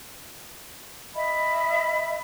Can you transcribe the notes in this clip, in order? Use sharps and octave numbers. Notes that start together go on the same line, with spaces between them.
D#5 E5 B5